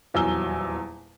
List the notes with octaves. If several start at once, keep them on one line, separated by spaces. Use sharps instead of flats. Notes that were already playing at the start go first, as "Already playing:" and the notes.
D#1 E2 F#3 G#5 E6 G7